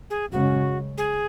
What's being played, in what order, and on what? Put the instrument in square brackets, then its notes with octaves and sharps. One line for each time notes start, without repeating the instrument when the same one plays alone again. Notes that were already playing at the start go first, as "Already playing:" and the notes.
[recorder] G#4
[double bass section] F#2 C#3 G#3 C#4 [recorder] F#4
[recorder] G#4